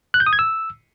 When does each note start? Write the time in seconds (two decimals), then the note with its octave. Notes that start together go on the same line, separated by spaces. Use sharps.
0.14 F#6
0.20 G6
0.26 D#6
0.33 G#6
0.39 E6